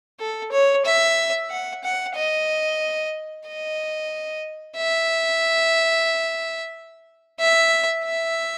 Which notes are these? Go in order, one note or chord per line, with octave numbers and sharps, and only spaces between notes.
A4
C#5
E5
F#5
F#5
D#5
D#5
E5
E5
E5